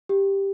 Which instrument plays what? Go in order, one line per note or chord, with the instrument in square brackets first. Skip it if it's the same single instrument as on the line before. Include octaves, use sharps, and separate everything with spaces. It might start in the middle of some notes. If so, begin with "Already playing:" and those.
[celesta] G4